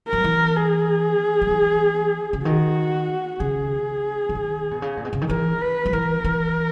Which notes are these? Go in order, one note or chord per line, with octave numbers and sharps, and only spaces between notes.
F#3 A#4
E3
G#4
F#3
E3
C#3
D#3 F#4
C#3 G#4
C#3
D#3
B2
C#3
A#2
B2
C#3
D#3
E3 A#4
B4
F#3
E3 A#4
E3